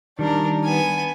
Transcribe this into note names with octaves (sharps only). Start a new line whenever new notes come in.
D#3 G3 D4 A#4
B3 G#5